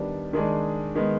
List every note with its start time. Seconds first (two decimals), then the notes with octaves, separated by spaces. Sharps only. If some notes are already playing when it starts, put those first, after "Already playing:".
Already playing: D#3 G3 B3 D4
0.33 D#3 G#3 D4 G#4
0.95 D#3 G#3 B3